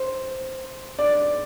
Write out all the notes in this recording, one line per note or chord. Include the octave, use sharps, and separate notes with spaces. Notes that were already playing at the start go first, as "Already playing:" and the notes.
Already playing: C5
D5